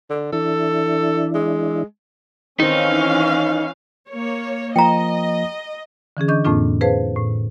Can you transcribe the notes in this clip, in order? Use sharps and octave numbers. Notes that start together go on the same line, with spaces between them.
D3
E3 D4 E4 A4
G#3
D#3 E3 C4 C#4 D#4 F5
A#3 C#5
F3 A#3 D#5 G5 A#5
D3 E3 C#4 G#4
D4 D#5 C#6 G6
F2 A2 A#3 C4 D4 F4
G#4 B4 C5 F5 A5
A2